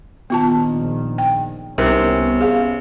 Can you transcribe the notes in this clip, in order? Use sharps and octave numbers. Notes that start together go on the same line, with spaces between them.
A#1 D#3 B3 F4 A5
G5
C2 C3 B3 C#4 D#4 A#4
G#4 F5